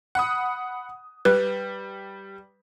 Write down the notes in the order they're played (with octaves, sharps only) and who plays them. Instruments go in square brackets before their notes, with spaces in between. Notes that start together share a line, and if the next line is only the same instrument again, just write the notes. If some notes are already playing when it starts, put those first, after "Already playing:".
[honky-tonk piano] F#5 B5 D#6
[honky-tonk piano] G3 [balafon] B4